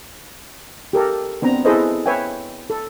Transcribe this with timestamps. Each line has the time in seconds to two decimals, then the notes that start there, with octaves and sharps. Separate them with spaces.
0.93 G4 A4 A#4
1.42 B3 C4 D4 A#5
1.65 E4 G#4 A4 B4 C5 D#5
2.06 B4 C#5 E5 G5 G#5
2.70 A4